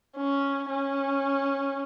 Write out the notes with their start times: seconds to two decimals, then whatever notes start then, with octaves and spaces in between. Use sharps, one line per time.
0.16 C#4
0.70 C#4